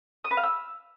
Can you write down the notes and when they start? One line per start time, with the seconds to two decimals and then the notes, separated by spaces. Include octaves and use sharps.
0.25 D#6
0.31 B4
0.37 F5
0.44 E6